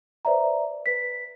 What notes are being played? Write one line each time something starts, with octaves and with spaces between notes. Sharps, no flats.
B4 C5 D5 E5 A#5
B4 B6